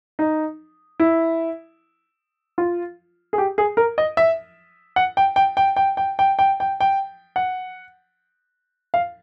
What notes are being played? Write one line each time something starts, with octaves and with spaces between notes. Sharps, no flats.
D#4
E4
F4
G#4
G4
G#4
A#4
D#5
E5
F#5
G5
G5
G5
G5
G5
G5
G5
G5
G5
F#5
F5